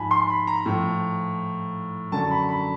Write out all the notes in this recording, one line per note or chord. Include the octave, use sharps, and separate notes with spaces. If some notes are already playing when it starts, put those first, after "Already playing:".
Already playing: G#2 F3 G#5 A5 B5
C6
B5
A#5
A2 F3
F#2 D3 F#3 A5
B5
B5